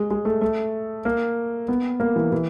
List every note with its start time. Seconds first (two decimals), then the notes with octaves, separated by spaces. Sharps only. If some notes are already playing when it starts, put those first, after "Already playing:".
Already playing: G#3
0.10 G#3
0.25 A3
0.41 A3
1.05 A#3
1.68 B3
2.00 A#3
2.16 E3
2.32 E3